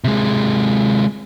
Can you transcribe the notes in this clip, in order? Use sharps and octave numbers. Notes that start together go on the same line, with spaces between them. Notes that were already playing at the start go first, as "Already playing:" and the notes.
C3 G#3